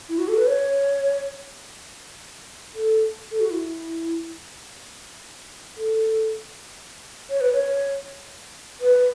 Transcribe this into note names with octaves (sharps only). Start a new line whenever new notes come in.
E4
F#4
A4
B4
C#5
A4
A4
F#4
E4
A4
C#5
B4
C#5
B4